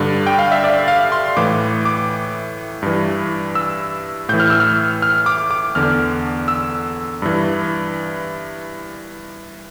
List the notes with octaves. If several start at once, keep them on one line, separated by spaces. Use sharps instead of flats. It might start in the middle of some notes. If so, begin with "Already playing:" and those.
Already playing: G2 D3 D5
G5
F5
E5
D5
F5
C6
A2 E3 D6
D6
G2 E3
E6
A2 E3 G6
F6
E6
F6
F6
D6
D6
E2 D3 F6
E6
G2 E3